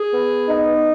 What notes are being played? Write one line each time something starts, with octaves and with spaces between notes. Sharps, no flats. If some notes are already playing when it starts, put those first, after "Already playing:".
Already playing: G#4
B3
D#4